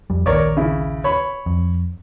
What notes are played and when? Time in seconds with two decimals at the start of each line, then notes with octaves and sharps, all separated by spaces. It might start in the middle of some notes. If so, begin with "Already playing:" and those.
0.10 F2 G3
0.26 A#1 D#2 A#4 C#5 D5
0.57 C#3 E4
1.04 C#5 B5
1.46 F2